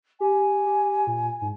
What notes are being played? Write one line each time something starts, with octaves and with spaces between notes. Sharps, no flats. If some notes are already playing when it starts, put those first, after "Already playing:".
G4 G#5
G4
A#2
G#2